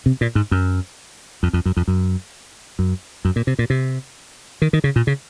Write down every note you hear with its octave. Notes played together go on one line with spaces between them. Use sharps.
C3
A#2
G#2
F#2
F2
F2
F#2
F2
F#2
F#2
F#2
A#2
C3
A#2
C3
D#3
D#3
C#3
A#2
C#3